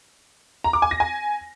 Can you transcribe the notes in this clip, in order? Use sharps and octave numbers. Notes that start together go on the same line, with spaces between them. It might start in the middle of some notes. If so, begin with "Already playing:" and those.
A#5
D6
G#5
A#6
G#5